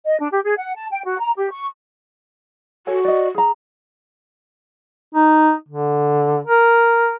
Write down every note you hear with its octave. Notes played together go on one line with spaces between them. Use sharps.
D#5
D4
G4
G#4
F#5
A5
G5
F#4
A#5
G4
C#6
F#4 A4 C#5 G#5
D5 D#5
G#4 A#5
D#4
D3
A#4